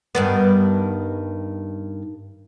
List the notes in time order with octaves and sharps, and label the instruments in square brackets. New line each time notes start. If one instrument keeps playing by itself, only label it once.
[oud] G2 D#3 B3